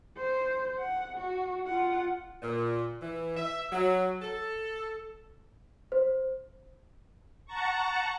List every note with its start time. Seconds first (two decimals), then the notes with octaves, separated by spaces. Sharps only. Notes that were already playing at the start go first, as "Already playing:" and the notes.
0.17 C5
0.79 F#5
1.17 F#4
1.66 F4 F#5
2.42 A#2
3.02 E3
3.37 E5
3.71 F#3
4.22 A4
5.92 C5
7.46 F#5 A5 A#5 C#6